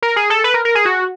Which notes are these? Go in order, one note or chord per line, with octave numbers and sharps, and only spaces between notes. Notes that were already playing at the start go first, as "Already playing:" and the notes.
A#4
G#4
A4
B4
A#4
A#4
G#4
F#4